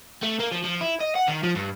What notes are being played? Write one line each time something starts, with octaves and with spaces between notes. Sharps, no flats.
A3
A#3
F3
F3
E4
D#5
F#5
D#3
F3
G2